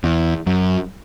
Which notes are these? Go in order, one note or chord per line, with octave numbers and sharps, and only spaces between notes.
E2
F#2